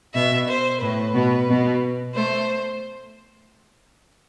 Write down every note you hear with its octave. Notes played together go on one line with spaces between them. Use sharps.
B2 E5
C5
A2 B4
B2
B2
A3 C5